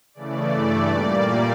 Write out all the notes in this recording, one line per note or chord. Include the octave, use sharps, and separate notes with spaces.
C#3 E3 A3 D5
G2 E3 A3
A#2 G3 A#3 D5